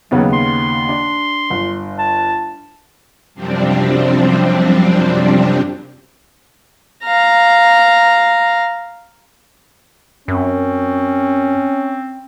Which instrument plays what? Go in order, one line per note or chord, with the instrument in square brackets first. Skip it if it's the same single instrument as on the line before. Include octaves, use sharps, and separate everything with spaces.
[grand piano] D#2 C#3 B3 [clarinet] F#3
[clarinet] C6
[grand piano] D4
G1
[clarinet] A5
[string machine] F#2 C3 F3 G3 C4 D4
[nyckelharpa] F5 A#5
[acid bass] F#2 [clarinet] C4 [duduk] C#4